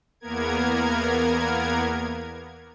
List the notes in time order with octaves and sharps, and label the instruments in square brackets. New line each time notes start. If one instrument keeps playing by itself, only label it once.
[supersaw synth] E2 A#3 B3 A#4 G#6